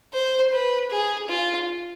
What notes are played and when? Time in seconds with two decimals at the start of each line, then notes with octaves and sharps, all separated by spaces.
0.13 C5
0.52 B4
0.90 G#4
1.29 F4